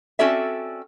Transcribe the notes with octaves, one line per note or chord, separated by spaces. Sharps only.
C4 C#4 F#4 A4 D5 E5